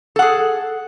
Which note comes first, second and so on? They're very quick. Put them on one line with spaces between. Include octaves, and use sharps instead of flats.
A4 F#5 G#4